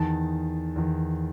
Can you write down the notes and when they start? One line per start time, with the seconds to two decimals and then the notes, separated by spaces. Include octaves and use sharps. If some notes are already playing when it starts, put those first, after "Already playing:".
Already playing: E2 D#3 A5
0.76 E2 D#3